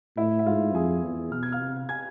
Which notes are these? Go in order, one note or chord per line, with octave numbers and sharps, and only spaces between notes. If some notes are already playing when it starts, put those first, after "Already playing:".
A2 E4 E5
E5
G#2 F4 F5
F2 G#4 G#5
E2
B2 F6
G#6
F5 F6
C3
G#5 G#6